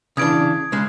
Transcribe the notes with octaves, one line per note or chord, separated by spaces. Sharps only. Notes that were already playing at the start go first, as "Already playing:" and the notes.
C#3 E3 D4 D#6 G#6 D7
C#3 G#3